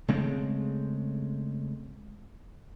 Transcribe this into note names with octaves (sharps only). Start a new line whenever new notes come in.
C#3 G#3 A3 C4